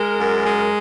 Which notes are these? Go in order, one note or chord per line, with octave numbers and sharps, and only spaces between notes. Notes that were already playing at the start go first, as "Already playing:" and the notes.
Already playing: G#3 A#4
F#2
G#3